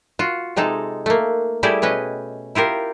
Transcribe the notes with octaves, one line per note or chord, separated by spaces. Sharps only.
F4 F#4
C3 G#3 D#4 A4
A3 A#3
G3 A3 E4 G4 G#4
B2 C#4 B4 D#5
E4 F4 G4 A#4